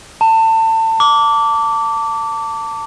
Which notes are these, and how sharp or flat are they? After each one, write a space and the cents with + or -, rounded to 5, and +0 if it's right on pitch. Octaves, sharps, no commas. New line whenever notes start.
A5 +30
D6 -20